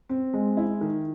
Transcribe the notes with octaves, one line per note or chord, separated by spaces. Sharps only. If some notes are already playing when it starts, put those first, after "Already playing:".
C4
G#3
E4
D#3